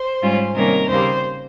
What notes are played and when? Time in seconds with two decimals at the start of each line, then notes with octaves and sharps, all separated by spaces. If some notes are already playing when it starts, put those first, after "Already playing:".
Already playing: C5
0.22 G#2 G3 C#4 F4
0.55 C3 D#3 G3 A#3 C#4 A#4
0.90 D#2 C#3 G3 A#3 C5